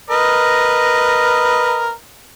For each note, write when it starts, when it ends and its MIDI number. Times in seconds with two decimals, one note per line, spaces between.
0.10 1.92 70
0.10 1.92 71
0.10 1.92 75